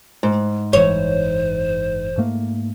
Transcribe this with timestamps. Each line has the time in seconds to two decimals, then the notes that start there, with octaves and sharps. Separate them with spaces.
0.23 G#2
0.73 F#1 E3 C5 C#5
2.17 G#2 A3 A#3